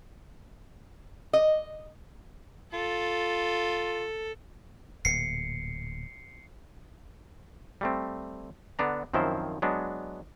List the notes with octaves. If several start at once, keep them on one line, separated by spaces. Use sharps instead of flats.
D#5
F4 A4
D1 A#2 C7 C#7
G3 A3 C4
D3 B3 D4 A#5
F#2 D#3 F3 C4 E4 C5
F#3 G#3 B3 D4